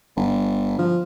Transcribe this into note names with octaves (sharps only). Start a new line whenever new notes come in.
G1
F3